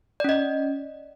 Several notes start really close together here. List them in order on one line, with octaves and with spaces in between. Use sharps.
D5 C#4 D#5